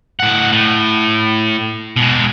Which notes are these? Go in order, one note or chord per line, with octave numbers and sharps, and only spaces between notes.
A2 F#5
A2
B2 G#3